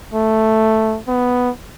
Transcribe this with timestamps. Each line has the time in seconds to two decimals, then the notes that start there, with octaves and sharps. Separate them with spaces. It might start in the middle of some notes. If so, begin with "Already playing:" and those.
0.14 A3
1.08 B3